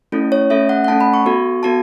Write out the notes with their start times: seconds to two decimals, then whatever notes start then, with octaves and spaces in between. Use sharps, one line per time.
0.12 A3 C#4 E4 A4
0.32 C#5
0.50 A3 C#4 A4 E5
0.69 F#5
0.84 F#5
0.88 A3 C#4 A4 A5
1.01 B5
1.14 C#6
1.26 B3 F#4 A4
1.63 B3 F#4 A4 A5